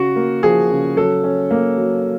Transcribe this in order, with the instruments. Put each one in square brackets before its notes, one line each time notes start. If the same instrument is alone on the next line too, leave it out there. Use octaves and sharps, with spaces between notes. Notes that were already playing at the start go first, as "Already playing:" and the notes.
Already playing: [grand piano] C#3 [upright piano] F#4
[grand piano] A#3
[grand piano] F3 [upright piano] G#4
[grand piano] C#3
[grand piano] F#3 [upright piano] A4
[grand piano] C#4
A#3
F#3